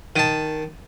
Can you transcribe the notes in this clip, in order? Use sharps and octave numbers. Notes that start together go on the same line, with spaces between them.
D#3 A5